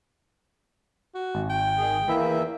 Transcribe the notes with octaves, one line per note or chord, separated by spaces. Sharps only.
F#4
G#1
G5
D#3 G#4
E2 E3 A#3 E4 E5